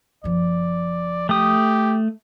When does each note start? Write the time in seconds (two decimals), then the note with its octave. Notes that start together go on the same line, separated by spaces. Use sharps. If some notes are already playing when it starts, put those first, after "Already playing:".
0.24 F#1 F3 D5
1.29 A3 G4 D#6